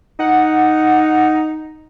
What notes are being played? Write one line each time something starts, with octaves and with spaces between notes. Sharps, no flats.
D#4 F#5